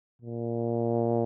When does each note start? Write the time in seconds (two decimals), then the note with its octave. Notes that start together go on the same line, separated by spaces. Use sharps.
0.22 A#2